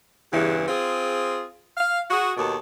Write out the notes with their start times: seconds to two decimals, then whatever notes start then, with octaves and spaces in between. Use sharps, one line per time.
0.32 E2 G2 C#3 E3
0.68 C4 F4 G#4
1.77 F5
2.10 F#4 G#4
2.37 D#2 B2 G#4 A4